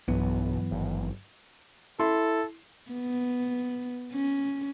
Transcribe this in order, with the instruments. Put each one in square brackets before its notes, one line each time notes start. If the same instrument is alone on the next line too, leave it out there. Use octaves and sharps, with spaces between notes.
[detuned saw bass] B1 [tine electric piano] G2 F#3 [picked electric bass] E3 B3
[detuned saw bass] G#1
[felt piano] E4 C6 [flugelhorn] A4
[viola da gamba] B3
C#4